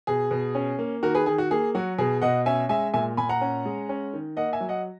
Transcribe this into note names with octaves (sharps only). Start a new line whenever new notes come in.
B2 G#4
B2
C#4
A#3
D#3 F#4 A#4
G#4 B4
D#3 G#4
F#4
A#3 G#4
F#3 F#4
B2 G#4
B2 D#5 F#5
C#4 E5 G#5
G#3 E5 G#5
A#2 E5 G#5
A#2 G#5 B5
F#5 A#5
C#4
G#3
C#4
D#3
A#3 D#5 F#5
E5 G#5
F#3
D#5 F#5